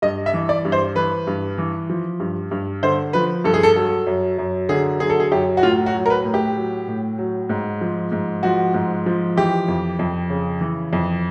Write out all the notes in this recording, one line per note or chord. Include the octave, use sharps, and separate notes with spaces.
G2 D#5
E5
E3
D5
G2
C5
E3 B4
G2
E3
F3
G2
G2
D3 C5
F3 B4
G2 A4
G#4
A4
F#3 A4
F#2
F#2
D3 G#4
F#3 G#4
A4
G#4
F#2 G4
F#4
A2 F4
F#4
F#3
A#4
B4
A2
G4
F#3
A2
F#3
G#2
F3
G#2
F3 F#4
G#2
F3
E3 G4
F2
F2
C#3
E3
F2